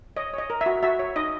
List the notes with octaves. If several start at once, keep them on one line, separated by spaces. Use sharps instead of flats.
C#5 D#5
C#5 D#5
A#4
E5
F#4
F#4 E5
C#5
D#4 D#5